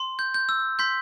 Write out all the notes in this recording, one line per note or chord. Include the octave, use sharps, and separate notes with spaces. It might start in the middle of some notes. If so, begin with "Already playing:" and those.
Already playing: C6
G6
G6
E6
C6 G6 B6